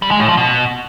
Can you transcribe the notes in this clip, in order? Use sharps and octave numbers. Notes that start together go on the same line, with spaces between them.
G3
G#3
A2
F3
B2